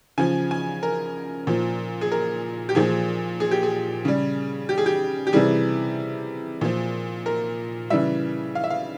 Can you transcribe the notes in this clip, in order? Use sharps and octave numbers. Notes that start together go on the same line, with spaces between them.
C#3 F3 G#5
G#5
A#4
A#2 F3
G#4
A#4
G4
A#2 F3 G#4
G#4
G4
G#4
C#3 G3
G4
G#4
G4
G4
C3 E3 G3 G#4
A#2 F3
A#4
C#3 E3 G3 E5
F5
E5
F5